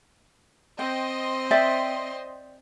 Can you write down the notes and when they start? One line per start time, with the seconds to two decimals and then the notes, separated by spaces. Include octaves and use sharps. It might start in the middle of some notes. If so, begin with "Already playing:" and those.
0.79 C4 D#5 G5 C6
1.51 D5 E5 G5